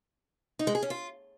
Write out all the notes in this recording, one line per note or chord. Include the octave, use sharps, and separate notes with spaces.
D#4
G#3
G#4
C#4
F4